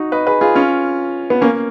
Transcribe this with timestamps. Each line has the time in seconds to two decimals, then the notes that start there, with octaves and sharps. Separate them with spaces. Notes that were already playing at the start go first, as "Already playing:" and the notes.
Already playing: D#4 F#4
0.12 B4 D#5
0.27 G#4 B4
0.41 F4 G#4
0.55 C#4 F4
1.30 B3
1.41 A#3 C#4